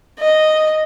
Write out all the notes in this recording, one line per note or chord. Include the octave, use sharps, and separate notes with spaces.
D#5